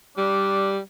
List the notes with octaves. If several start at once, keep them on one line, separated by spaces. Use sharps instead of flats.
G3 D4